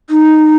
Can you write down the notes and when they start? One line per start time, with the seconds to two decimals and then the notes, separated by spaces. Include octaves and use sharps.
0.10 D#4